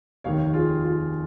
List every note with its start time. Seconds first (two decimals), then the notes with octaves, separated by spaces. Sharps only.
0.24 F1 D#2 D#3 C#5 F5
0.54 F4 G#4
0.84 F4